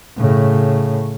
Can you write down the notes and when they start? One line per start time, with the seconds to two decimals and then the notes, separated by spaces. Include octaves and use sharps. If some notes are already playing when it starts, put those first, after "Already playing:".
0.17 A2 C#3